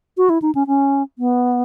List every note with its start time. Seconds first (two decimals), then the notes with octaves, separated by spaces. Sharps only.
0.17 F#4
0.30 E4
0.42 D#4
0.55 C#4
0.67 C#4
1.19 B3